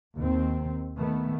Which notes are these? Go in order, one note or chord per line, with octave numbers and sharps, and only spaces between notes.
D#2 D#3 C4
D#3 A3 B3